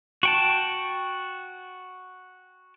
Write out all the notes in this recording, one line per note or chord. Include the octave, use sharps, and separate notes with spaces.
F#4 G5 A5